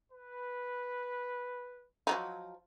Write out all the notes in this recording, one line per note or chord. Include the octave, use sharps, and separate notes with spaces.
B4
F3 F#3 D#4